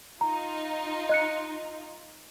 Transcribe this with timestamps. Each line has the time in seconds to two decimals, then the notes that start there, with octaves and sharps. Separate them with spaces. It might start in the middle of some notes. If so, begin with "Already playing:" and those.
0.21 D#4 F4 A#5
1.09 D#5 F#6 C#7